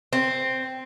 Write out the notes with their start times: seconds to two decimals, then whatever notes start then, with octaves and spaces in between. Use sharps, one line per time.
0.13 C4